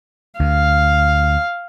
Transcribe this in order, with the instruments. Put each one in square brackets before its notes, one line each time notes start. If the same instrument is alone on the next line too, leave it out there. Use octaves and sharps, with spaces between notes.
[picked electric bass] D2 [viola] F5